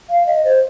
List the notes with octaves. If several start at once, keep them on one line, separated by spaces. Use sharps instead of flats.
F5
D#5
C5